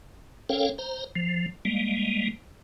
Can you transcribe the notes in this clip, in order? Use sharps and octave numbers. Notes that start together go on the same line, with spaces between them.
C#4 A4 A#4 C#5 F5 G5
C5 A#5
F3
G3 G#3 A#3